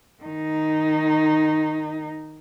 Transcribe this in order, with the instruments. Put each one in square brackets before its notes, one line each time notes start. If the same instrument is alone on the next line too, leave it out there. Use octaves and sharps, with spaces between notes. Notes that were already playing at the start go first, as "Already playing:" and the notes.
[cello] D#3 D#4